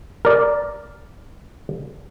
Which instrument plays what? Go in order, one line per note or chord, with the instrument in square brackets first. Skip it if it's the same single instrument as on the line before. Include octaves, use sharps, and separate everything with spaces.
[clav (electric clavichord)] A#4 D5